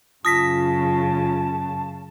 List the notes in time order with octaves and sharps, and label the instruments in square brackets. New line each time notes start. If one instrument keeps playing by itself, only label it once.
[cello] F#2 C#3 [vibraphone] F4 [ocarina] A5 [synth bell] D#6 A#6 B6